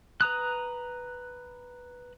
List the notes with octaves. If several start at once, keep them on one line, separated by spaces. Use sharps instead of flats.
B4 A#5 D#6 F#6